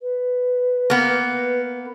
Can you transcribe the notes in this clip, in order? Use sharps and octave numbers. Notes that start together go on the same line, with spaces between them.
B4
A#3 B3